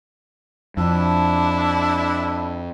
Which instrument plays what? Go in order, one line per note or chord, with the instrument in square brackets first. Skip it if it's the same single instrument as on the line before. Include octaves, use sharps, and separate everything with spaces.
[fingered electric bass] F2 [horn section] D4 E4